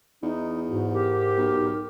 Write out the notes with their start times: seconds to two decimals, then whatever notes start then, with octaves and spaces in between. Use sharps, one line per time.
0.22 E2 D#4
0.70 G#2 F#4
0.93 G4 A#4
1.37 B1